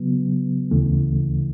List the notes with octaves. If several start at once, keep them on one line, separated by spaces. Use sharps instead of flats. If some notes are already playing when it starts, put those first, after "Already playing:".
Already playing: C#3 F#3 B3
D2 C#3 E3 A3